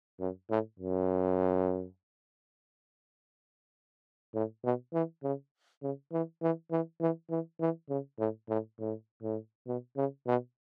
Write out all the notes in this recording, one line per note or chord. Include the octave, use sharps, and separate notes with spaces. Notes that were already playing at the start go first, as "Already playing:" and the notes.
F#2
A2
F#2
A2
B2
E3
C#3
C#3
E3
E3
E3
E3
E3
E3
C#3
A2
A2
A2
A2
B2
C#3
B2